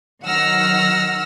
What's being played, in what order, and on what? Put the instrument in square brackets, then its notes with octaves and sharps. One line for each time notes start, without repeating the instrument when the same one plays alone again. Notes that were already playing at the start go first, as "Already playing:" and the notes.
[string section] D#3 F#3 F#5 E6 F6 A#6